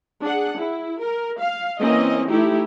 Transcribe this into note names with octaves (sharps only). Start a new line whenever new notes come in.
D4 G#4 F#5
E4
A#4
F5
E3 A#3 C4 C#4 D#5
A3 D#4 E4 G4